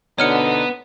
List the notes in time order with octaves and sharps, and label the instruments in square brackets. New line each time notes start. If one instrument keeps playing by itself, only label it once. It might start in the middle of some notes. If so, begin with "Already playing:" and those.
[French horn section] D2 B2 D3 [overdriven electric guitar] B3 [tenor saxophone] D#4 [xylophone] C#5 F6 C#7